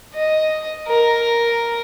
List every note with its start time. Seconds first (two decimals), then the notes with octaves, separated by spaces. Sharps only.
0.14 D#5
0.87 A#4